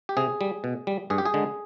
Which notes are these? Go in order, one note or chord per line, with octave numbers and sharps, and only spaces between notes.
G4
C3 G#4
G3
B2
G3
G2 G#4
G4
G#4
D3 G#3